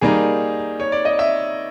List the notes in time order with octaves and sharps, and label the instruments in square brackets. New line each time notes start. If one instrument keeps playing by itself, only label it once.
[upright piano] D#3 G3 A#3 D#4 [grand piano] G#4
[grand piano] C#5
D5
D#5
E5